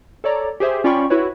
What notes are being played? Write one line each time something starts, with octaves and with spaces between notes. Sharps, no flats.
A4 C#5 D5 A#5
G4 G#4 C5 E5
C#4 F4 D5 G5 B5 C#6
E4 F#4 B4 C#5